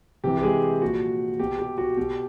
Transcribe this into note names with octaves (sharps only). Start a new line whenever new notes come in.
C3 E3 G4
G4
G#3 G#4
A#2 F3 F#4
B2 G4
G4
F#4
B2 G4